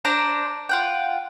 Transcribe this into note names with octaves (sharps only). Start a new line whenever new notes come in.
D4 C5 A#5
F4 F#5 G5